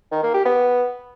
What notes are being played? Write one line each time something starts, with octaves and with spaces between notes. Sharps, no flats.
D#3
A#3
G4
B3